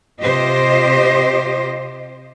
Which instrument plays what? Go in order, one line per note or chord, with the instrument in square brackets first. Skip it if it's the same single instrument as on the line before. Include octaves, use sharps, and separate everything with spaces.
[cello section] C3 F4 G4 C5 D#5